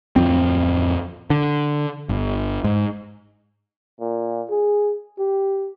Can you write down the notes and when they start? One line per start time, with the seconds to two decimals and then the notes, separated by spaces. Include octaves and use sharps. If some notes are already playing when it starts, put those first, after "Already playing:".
0.16 D1 G1 F2 C4
1.30 D3
2.09 G1
2.64 G#2
4.01 A#2
4.50 G#4
5.19 G4